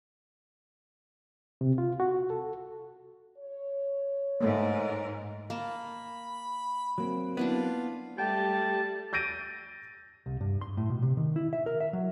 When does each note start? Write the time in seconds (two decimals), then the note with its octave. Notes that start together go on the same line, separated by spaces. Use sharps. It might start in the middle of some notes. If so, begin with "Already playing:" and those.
1.61 C3
1.78 F4
2.00 F#4
2.30 A4
3.38 C#5
4.41 G#2 A3 A#3 A#4
5.50 A#3 A5 B5
6.98 F#3 A#3 C4
7.37 B3 D4 E4 F4 D5
8.18 G3 A3 G4 G5 A5
9.13 G6 A6 A#6 D7 D#7
10.26 C2
10.41 G2
10.61 C6
10.77 A2
10.90 B2
11.02 C3
11.17 D#3
11.36 E4
11.53 E5
11.66 A#4
11.80 E5
11.93 F#3